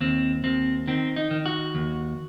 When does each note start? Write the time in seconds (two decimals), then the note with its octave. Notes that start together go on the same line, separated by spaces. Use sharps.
0.01 D#2 C4
0.44 D#2 C4
0.88 D#3 C4
1.16 D#4
1.31 D#3
1.46 F#4
1.75 D#2